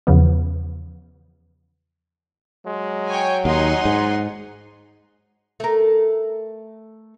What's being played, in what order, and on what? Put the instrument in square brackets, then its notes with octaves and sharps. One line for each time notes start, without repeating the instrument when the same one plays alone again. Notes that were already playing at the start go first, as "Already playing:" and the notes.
[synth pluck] E2 C#3 F3 B3
[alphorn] F#3 [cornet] G#3
[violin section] C#5 G5 G#5
[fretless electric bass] D#2 [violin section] D#4 G#5 C6 [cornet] F#5
[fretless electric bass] G#2
[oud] A3 A#4